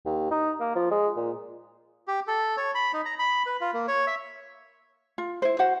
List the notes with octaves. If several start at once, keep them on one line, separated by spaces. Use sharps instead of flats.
D#2
D#4
A#3
F3
G#3
A#2
G4
A4
C#5
B5
D#4
A#5
B5
B4
F4
A#3
C#5
E5
F4
E4 C5
F#4 C5 F#5